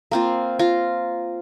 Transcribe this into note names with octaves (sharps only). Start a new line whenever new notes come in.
A#3 C4 F4
F4 A#5